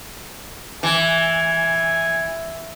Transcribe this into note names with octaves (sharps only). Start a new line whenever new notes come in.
E3 G#5